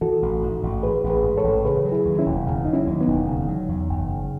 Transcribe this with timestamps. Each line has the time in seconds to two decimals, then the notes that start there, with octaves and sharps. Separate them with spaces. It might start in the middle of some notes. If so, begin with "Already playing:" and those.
0.01 E3 F#4 A4
0.22 A1
0.43 G#2
0.63 A1
0.83 E3 G#4 B4
1.04 A1
1.10 G#4 B4
1.24 G#2
1.37 A4 C#5
1.44 A1
1.65 C#3 G#4 B4
1.85 F#3
1.92 E4 G#4
2.05 D#2
2.18 C#4 E4
2.26 E1
2.46 C#3
2.65 F#3 D#4
2.73 C#4 E4
2.87 D#2
3.00 B3 D#4
3.08 E1
3.27 C#3
3.49 F#3
3.69 E2
3.89 F#1
4.09 C#3